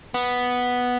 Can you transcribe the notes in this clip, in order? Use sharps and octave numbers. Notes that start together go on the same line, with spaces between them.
B3